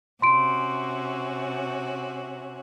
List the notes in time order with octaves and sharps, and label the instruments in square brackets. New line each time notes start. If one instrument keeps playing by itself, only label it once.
[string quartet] C3 C#4 F#4 [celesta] C6 D7